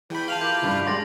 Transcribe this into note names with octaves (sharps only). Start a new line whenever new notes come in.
E2 E3 G5 B5
F4 F5 A5 F7 F#7
A#3 E4 G4 G6 F#7
F1 G2
G#3 D5 C6 A6 A#6